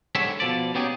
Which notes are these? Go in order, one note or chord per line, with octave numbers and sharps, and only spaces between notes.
G#2 D3 G3 C#5 E5
B2 F3 D5
B2 B3 C#4 D#4 G4 G#4